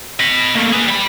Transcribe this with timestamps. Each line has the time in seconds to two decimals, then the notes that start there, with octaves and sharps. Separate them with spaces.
0.19 D#5 B5
0.55 A3 A#3
0.72 G#4 B4
0.88 G3 B5